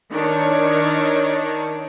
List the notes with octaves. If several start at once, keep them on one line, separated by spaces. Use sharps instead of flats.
D#3 D4 C#5